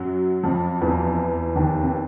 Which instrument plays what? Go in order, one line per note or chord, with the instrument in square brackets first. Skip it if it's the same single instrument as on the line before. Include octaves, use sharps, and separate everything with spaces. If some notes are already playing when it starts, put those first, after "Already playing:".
Already playing: [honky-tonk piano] F#2 F#3
F2 F3
E2 E3
D#2 D#3
C3